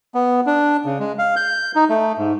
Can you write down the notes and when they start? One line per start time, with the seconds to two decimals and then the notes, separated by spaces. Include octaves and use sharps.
0.14 B3
0.46 D4
0.85 C#3
0.99 G#3
1.18 F5
1.36 G6
1.76 D#4
1.89 A3
2.18 G#2